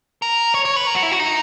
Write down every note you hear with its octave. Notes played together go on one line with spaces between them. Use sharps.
A#4
C#5
C#5
B4
A#4
F#4
E4
F#4
D#4